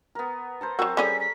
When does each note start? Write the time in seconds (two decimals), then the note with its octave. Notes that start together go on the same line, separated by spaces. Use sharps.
0.15 B3 A#4
0.61 A4 A#4 C5
0.79 F#3 C4 F#4 A#4
0.97 G3 C#4 G#4 A4 C#6 B6
1.20 B6